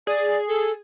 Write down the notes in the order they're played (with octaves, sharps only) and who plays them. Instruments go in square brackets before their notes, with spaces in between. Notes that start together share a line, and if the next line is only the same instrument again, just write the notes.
[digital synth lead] G#4 [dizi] D5
[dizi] A4